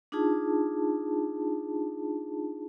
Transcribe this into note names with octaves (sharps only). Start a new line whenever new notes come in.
D4 D#4 F4 G#4 A5